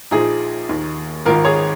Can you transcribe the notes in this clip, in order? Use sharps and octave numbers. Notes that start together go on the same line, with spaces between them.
A#1 A#2 F3 D#4 G#4
D#2 D#3
G#1 G#2 D#3 F4 A#4
G#4 C#5